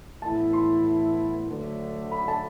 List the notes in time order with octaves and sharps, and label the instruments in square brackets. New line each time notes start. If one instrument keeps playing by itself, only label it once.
[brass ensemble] A2 E3 B3 E4 [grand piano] A5
[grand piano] C6
[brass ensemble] D2 D3 F#3 A3
[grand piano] B5
A5